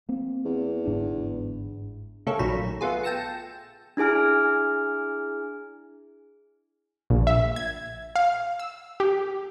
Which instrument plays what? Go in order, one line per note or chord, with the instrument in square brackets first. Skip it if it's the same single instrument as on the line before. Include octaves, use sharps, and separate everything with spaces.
[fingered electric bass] A#3 C4
[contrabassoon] E2
[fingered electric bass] G1 G#2 D4
[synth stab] C#3 A3 A#3 A4 C#5
A#1 D#3 F#3 A#5 B5 E7
A3 B3 F4 G#4
G5 A5 E6 A#6 C#7
[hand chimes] D4 E4 G#4 G#5 F6
[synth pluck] A#1
E5
G#6
F5
E6
G4